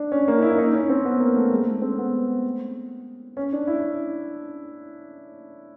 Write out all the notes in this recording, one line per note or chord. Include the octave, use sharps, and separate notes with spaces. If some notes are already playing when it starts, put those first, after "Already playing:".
Already playing: D4
C#4
A#3
D#4
E4
D#4
C#4
C4
B3
A#3
A3
G#3
A3
C4
B3
C#4
D4
E4